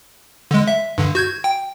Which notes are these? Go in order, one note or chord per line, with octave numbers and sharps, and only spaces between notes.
D3 G#3
E5
G2 D3
F#4 G6 G#6
G5